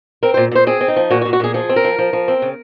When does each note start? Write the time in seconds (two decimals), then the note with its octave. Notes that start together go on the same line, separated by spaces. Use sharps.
0.23 C4 A#4
0.34 A#2 C5
0.51 A#2 C5
0.67 C4 G#4
0.81 C4
0.88 D#4
0.96 F3
1.10 A#2 F#4
1.21 F#4
1.25 A#2
1.33 F#4
1.40 A#2 G#4
1.54 F3 G#4
1.69 C4
1.76 A#4
1.84 F3
1.99 F3
2.13 F3
2.28 C4
2.42 C#3